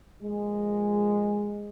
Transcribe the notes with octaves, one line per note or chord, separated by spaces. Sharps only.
A#2 F3 G#3